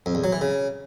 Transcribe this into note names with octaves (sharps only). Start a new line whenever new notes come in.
F2
E2
F#3
E3
C#3